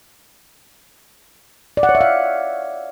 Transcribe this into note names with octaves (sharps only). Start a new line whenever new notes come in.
D5
F#5
C#5
E5
F5